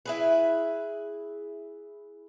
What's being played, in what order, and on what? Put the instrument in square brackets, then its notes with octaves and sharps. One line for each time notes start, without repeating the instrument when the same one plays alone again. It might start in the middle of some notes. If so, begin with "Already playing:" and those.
[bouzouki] E4 G#4 B4